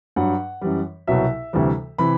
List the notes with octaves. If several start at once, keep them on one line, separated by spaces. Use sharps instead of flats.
G2 F#3 F#5
F#2 E3 G3
C2 B2 F#3 E5
D2 C3 E3 G3
C3 E3 B5